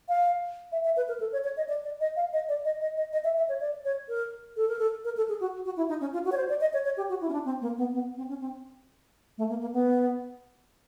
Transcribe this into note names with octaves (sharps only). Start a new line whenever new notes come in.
F5
E5
E5
B4
A#4
A4
C#5
C#5
D#5
D5
D5
D#5
F5
D#5
D5
D#5
D#5
D#5
D#5
E5
E5
C#5
D5
C#5
A#4
A4
A#4
A4
A#4
A4
G#4
F#4
F#4
E4
D#4
C#4
F4
F#4
C#5
C5
D5
D#5
C#5
C#5
G4
F#4
E4
C#4
D4
C4
A#3
B3
B3
C4
C#4
C4
A3
A#3
A#3
B3